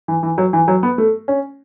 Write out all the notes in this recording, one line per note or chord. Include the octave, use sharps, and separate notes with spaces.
E3
E3
F#3
E3
F#3
B3
A3
C#4